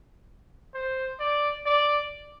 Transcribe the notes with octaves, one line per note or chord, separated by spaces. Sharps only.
C5
D5
D5